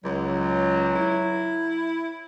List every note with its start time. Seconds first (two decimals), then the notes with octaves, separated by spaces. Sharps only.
0.04 C#2 F#3
0.95 E4